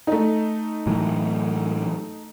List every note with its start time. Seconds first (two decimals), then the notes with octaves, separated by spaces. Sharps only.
0.07 A3 D#4
0.87 A2 E3 F#3